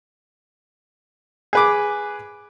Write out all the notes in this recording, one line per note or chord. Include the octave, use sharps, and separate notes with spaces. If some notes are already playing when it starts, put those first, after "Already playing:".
G#4 B4 D6